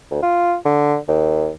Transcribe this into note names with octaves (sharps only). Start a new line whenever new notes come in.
D2
F4
D3
D#2